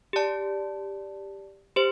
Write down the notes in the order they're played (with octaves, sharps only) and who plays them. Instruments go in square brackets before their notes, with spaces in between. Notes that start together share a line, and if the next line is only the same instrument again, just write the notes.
[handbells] G4 D5 A5
G4 C5